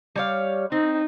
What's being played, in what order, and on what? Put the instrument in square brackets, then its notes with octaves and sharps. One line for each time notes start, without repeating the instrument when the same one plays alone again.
[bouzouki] G3 C#5 F5
[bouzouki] C4 [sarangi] D#4